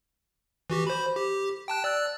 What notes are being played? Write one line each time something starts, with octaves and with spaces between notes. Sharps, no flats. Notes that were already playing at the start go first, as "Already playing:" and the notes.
E3 F#4 G4
C5 B5
G4
G5 A5 F#6
D5 E6 F#6